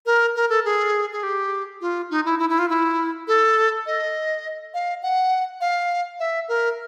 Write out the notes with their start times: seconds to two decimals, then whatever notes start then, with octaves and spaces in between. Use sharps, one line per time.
0.06 A#4
0.36 A#4
0.49 A4
0.65 G#4
1.12 G#4
1.23 G4
1.81 F4
2.10 D#4
2.25 E4
2.39 E4
2.49 E4
2.59 F4
2.69 E4
3.28 A4
3.86 D#5
4.74 F5
5.03 F#5
5.61 F5
6.20 E5
6.49 A#4